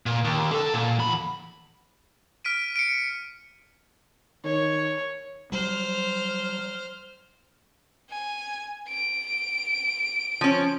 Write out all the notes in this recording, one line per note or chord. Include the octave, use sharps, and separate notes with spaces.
A#2
D#2
D4 A4
A#2
E2 B5
F6 B6 D7 D#7
C#7 D7
D#3 C#5
F#3 G3 C5 F6
G#5
D7
F3 C#4